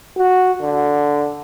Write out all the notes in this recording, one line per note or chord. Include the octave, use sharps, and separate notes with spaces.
F#4
D3